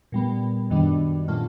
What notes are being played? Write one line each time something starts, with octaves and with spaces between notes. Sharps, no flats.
A#2 G3 B3
F#2 D#3 G3 B3 D4
A#2 F#3 A3 C#4 F4